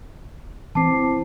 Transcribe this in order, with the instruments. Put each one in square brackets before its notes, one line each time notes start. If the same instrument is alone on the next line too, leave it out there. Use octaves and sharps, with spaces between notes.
[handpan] E3 C4 [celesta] A5 D6 C7